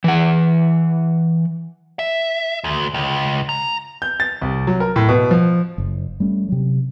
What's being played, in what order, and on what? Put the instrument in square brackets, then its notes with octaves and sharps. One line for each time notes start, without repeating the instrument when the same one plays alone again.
[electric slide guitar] E3 F#5
[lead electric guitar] E5
D2
C#2
A#5
[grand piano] G6
A6
C2
F#3
A#4
A2
B2
F3
[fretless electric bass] F#1
G3 A3 C#4
C3 F#3